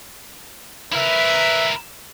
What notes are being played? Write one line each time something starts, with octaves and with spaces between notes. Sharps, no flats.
E4 A#4 B4 E5